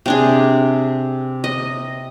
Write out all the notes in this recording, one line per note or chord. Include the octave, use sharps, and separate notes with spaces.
C3 D4 G#4
D#5